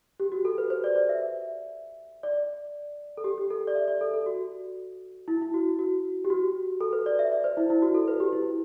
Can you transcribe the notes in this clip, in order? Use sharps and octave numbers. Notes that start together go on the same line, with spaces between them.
G4
F#4
A4
B4
C5
D5
D5
E5
D5
A4
G4
G4
A4
D5
E5
D5
A4
A4
F#4
E4
E4
F#4
F#4
G4
F#4
A4
B4
D5
E5
D5
C5
E4
E4
F#4
A4
B4
G4
E4